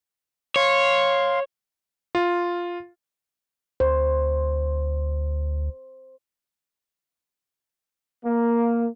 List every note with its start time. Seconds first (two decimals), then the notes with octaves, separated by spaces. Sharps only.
0.56 C#5 F5 C6
2.15 F4
3.80 D2 C5
8.24 A#3